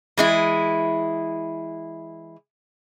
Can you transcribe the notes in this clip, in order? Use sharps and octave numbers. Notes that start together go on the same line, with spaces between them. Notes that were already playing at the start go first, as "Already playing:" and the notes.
E3 G#3 E4